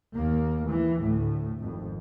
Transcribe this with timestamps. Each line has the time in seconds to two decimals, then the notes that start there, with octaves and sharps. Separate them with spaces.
0.12 D#2 A#3
0.67 E3
0.98 D2 A2
1.60 G#1 F2